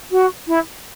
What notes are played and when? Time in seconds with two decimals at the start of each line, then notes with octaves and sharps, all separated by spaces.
0.11 F#4
0.47 E4